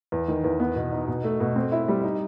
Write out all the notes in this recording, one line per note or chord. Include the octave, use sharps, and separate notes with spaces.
E2
D#3
E2
B3
B2
D#4
B2
A3
B2
C4
E4
G3
D#4